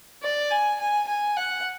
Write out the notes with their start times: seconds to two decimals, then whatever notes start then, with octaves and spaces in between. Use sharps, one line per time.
0.23 D5
0.51 G#5
0.80 G#5
1.08 G#5
1.36 F#5